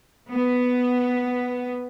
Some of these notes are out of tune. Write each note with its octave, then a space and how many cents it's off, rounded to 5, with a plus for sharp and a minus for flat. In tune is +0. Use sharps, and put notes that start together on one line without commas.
B3 +5